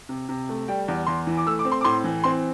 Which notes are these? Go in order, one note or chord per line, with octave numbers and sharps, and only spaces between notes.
C3
C3
A3
G3 G5
E2
E2 C6
E3
D6
A3 E6
D6
C4
C6
D6
A2 C6
E3
C4 C6